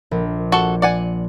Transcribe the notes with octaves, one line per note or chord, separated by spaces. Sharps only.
A#1
F#4 A4
D5 F#5 G#5